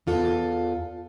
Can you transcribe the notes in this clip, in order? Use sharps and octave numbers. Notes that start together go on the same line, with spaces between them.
E2 F4 A4